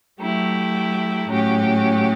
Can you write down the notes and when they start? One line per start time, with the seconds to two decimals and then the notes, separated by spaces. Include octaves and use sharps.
0.20 F#3 A3 E4 G4
1.28 A2 F#3 C#4 G4